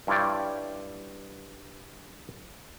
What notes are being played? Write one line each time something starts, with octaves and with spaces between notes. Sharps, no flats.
G2 E4 F4 C#5 D5 G5